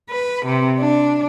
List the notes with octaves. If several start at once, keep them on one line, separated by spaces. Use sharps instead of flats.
B4
C3
D4